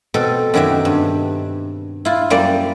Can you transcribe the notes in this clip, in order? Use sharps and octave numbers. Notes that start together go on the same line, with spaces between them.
B2 C4 A4
F#2 D#3 F#3 G4 E5
G2
E4 F4
F#2 G3 A#3 C5 D5 C6